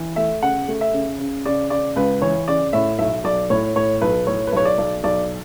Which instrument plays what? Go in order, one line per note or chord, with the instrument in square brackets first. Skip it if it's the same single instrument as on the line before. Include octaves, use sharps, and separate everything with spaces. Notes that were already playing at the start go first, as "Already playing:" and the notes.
Already playing: [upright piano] E3
A3 E5
C#3 F#5
A3
E5
C#3
C#3
C#3 D5
C#3 D5
C#2 B4
E3 C#5
C#3 D5
A2 E5
B1 E5
B1 D5
A2 C#5
A2 C#5
B1 B4
A2 C#5
B4
B1 C#5
D5
B1
B1 D5